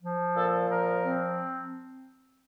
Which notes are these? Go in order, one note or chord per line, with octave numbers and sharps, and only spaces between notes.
F3
A#2 A4
F3 A#4
C4